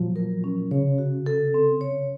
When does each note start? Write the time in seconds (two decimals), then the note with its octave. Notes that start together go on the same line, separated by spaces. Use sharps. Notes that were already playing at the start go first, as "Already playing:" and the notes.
Already playing: A#2 F3 F#3
0.16 A#4
0.44 C#4
0.71 C#3 C#5
0.98 F#4
1.26 A4
1.54 C4
1.81 C#5